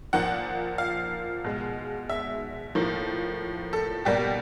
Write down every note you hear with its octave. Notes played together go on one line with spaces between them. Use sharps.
A#2 F3 A#3 F#5
F5
B2 G#3
E5
A2 F3 A#3
A4
B2 G3 A#3 G4